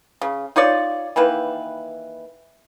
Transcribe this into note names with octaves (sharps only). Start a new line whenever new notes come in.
C#3
D#4 F4 C#5 D5
D#3 E3 A#3 B4